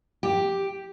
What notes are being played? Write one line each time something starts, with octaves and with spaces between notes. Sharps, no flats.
G4